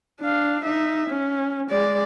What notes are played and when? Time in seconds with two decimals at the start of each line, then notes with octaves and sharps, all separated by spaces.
0.21 D4 F5
0.64 D#4 E5
1.09 C#4
1.70 G#3 D5